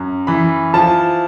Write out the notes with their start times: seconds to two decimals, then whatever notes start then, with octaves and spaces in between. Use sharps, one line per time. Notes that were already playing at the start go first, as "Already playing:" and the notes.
Already playing: F#2
0.27 E3 B5
0.74 F3 A5